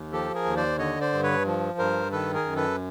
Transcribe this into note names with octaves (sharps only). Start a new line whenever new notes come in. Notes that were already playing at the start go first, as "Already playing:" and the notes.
Already playing: D#2
F3 G4 A4
G#4 A#4
D#2
C5 D5
D3 C#5 D#5
C5 D5
G2
B4 C#5
F3
G2 A#4 C5
D#3 A4 B4
G#4 A#4
F#2
A4 B4